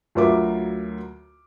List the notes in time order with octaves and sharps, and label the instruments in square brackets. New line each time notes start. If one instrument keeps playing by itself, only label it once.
[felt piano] D2 F#3 F4 A#4 E5 D6